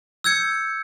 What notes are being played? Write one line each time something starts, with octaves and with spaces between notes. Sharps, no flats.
E6 G6 G#6 C#7